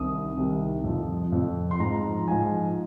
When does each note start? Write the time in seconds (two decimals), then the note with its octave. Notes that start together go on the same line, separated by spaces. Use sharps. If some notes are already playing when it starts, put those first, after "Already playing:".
Already playing: C2 C3 D#3 D#6
0.37 C2 C3 D#3
0.84 F2 F3
1.32 F2 F3
1.71 C6
1.79 G#2 F3 A#5
2.27 G#2 F3 G#5